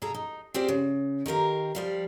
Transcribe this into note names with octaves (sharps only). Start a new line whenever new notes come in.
B2 G#4 A4 A#5
D#4
C4 F4 G4 G#4 C5 D5
C#3
D#3 G4 A#4 F5
F3 G3 F5